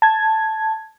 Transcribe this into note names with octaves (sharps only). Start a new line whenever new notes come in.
A5 G#6